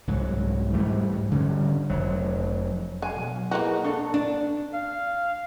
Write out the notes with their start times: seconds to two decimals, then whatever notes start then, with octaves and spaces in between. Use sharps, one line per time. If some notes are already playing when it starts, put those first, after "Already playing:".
0.07 C2 G#2 F#3
0.74 G#2 E3 G3 A3
1.31 D3 G3 C#4
1.90 F1 F#3
3.02 D3 F5 F#5 G#5
3.16 B2 F#3
3.51 A#3 D#4 E4 F#4 G#4 B4
3.85 D4 A4 C#6
4.14 D4
4.74 F5